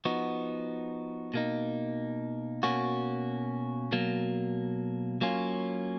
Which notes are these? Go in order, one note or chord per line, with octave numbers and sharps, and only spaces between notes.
F3 B3 D#4 F#4
B2 A#3 D#4
B2 A#3 C#4 F#4
B2 F#3 A#3
F#3 A#3 C#4 F4